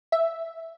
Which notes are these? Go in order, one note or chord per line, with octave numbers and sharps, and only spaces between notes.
E5